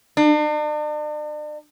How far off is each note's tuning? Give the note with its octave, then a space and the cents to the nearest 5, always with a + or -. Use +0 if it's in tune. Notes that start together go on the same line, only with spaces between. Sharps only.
D4 +45